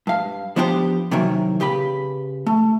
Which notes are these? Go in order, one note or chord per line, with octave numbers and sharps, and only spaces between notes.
G2 F5
F3 B3 D4 E4 G4 C5
C3 D#3 E3 F#3 A#3
C#3 G4 B4 B5
A3